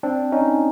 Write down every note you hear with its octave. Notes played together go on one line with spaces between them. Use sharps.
C4 D4
C#4 D#4